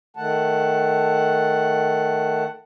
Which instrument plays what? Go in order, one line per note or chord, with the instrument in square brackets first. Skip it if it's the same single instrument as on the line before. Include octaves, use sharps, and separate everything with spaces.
[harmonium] D#3 A3 F#5 A5